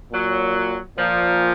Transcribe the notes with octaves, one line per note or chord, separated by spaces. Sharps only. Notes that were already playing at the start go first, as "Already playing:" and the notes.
A#2 F#3
A#2 F3